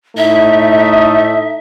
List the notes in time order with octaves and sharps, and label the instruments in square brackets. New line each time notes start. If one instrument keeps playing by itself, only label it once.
[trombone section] A2 A3 D#4 [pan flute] E5